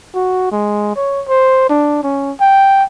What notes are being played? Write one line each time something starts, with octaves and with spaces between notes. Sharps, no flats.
F#4
G#3
C#5
C5
D4
C#4
G5